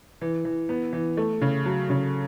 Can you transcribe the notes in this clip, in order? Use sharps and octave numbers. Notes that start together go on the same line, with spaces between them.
E3
E3
B3
E3
A3
C#3
F#3
C#3